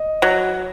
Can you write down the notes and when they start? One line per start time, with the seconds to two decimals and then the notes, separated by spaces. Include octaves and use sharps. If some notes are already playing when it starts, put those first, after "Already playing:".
Already playing: D#5
0.22 F#3